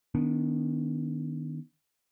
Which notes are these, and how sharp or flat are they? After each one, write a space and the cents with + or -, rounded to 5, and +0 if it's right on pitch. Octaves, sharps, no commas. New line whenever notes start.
D#3 +0 B3 +0 D4 -35